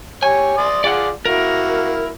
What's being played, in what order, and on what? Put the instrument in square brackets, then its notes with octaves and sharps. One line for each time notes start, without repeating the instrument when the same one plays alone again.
[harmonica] G4 C#5 [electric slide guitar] G#5
[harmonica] D5 C6 D#6
[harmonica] F4 G#4 D6 [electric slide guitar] D5 F#5
[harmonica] A#3 E4 F#4 [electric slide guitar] A#4